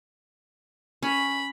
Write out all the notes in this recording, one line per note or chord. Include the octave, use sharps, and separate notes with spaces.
C#4 B5